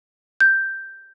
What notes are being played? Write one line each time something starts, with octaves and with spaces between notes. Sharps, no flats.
G6